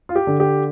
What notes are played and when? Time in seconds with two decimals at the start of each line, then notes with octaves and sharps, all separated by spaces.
0.09 F4
0.16 G4
0.27 D3
0.40 G4